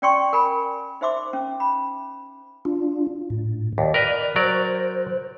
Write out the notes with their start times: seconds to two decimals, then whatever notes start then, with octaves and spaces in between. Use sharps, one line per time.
0.02 C#4 D5 G5 C6 C#6
0.33 A#4 G#5 B5
1.01 D#4 C5 E5 C6 D6
1.33 C#4
1.60 B5
2.65 D4 F4
3.30 A2
3.78 D#2 D5
3.94 A#4 B4 D#5
4.36 F#3 A#4 C5 D5